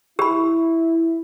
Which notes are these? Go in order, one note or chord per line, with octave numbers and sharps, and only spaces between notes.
E4 G4 B5